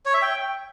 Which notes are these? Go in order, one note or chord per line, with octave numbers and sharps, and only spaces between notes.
C#5
E5
G5